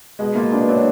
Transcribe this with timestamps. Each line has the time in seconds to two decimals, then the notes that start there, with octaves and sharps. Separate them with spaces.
0.19 B2 G#3
0.35 A#3 F4
0.52 B2 D4
0.61 B3
0.69 F#3 D4